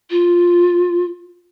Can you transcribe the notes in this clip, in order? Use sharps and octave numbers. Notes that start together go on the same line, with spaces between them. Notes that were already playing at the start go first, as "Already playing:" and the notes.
F4